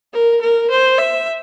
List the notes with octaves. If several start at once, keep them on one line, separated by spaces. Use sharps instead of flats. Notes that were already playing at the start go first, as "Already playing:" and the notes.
A#4
A#4
C5
E5